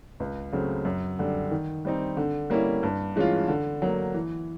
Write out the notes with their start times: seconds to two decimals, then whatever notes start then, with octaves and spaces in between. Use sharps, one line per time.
0.20 C#2
0.53 C#3 F#3 A3 C4
0.85 F#2
1.19 D3 G3
1.51 D#3
1.85 G3 C4 D#4
2.17 D3
2.50 G3 A#3 C#4 E4
2.83 G2
3.16 E3 G#3 C#4 F4
3.48 D3
3.82 F#3 A#3
4.14 E3